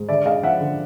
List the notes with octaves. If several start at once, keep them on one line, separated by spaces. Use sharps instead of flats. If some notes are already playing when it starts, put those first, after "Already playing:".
Already playing: G#2
D3 D5 E5
G#3 D#5 F5
F3 E5 F#5
D3